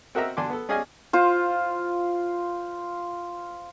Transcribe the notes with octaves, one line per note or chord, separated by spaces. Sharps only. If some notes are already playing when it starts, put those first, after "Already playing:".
C4 F#4 A#4 D#5 E5 A#5
D3 D4 G#5 C6 D6
B3 A4
C#4 G#4 D5 D#5 F5 G#5
F4 C5